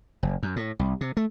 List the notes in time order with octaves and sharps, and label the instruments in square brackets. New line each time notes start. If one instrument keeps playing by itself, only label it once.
[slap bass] F#1
F#2
A2
C2
C3
A3